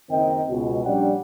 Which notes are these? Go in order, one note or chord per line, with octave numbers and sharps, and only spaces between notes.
F#1 D#3 C4 D#5 G5
C#2 B2
A#1 G3 C#4 D4 F#5 G5